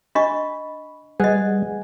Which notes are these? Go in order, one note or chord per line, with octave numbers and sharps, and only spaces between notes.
D4 D#5 B5 C#6
G3 G#4 B4 D#5 F#5 G#5